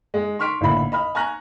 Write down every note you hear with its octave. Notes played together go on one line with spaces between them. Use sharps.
G#3
C6 C#6 F6 B6 D7
A1 A#2 D3 E4 B5
D#5 B5 F6
G#5 A#5 C#6 F6 F#6 A#6